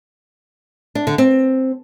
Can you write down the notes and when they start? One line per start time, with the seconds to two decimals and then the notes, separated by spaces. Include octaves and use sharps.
0.95 D4
1.07 D3
1.18 C4